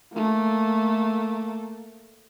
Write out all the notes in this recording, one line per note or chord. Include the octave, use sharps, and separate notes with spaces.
A3 A#3